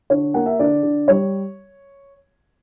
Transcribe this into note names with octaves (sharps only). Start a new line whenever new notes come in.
D3 C#5
A#3 F#5
E5
D3 D5
D3
G3 C#5